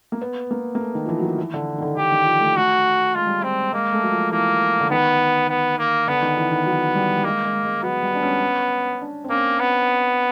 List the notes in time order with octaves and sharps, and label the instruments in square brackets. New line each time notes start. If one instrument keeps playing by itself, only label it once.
[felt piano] A#3
B3
A#3
A#3
A3
D#3
F3
E3
F#3
F3
E3
D3
D#3
D3
[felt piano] D3 [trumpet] G4
[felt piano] D#3
F3
A3
[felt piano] A3 [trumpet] F#4
[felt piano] G#3 [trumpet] F4
[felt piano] G3
[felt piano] G#3 [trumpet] C4
[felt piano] G#3 [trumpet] A#3
[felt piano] A3
F#3
F3
[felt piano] E3 [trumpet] A#3
[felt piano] D3
[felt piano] D#3 [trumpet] B3
[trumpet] B3
A#3
[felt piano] D3 [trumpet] B3
[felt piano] D#3
E3
D#3
F#3
G3
G3
[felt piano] G#3 [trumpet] A#3
[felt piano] G#3
G#3
[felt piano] F#3 [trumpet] B3
[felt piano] G3
D4
C#4
D4
C4
[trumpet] A#3 [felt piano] C#4
[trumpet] B3